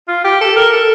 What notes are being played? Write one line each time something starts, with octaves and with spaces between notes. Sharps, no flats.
F4
G4
A4
A#4
A4